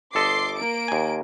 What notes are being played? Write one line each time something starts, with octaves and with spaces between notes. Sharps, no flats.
G1 A4 D#5 C6 D6 C7
A#3 D7
D#2 G#5